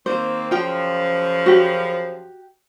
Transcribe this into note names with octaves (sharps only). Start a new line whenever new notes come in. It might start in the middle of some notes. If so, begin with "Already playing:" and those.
D#3 A#3 C4 C5
F#2 C#3 F3 F4 G5
F#4 G4